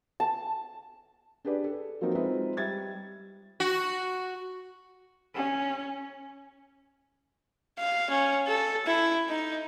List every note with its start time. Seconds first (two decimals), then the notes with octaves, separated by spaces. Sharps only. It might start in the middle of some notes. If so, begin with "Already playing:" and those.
0.20 A5
1.45 D4 G4 G#4 B4 D5
1.64 A4
2.01 F3 F#3 A#3 C4 D#4 F4
2.15 G#3 C4 D#4 F4 B4 E5
2.57 G3 E5 G#6 A6
3.60 F#4
5.35 C#4
7.78 F5
8.10 C#4
8.47 A4
8.86 E4
9.29 D#4